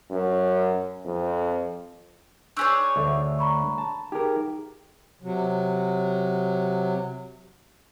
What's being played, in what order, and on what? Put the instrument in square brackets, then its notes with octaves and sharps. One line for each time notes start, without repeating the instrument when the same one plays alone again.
[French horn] F#2
F2
[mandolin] D4 G#4 C#5 [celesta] C#6 E6 G6
[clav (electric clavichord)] D2 A3
[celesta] A#5 B5 C#6
[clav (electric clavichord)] A5
[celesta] D#4 G#4 [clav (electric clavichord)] G4 A#4
[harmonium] C3 F#3